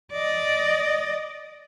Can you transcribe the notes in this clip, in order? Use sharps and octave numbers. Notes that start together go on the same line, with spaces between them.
D5 D#5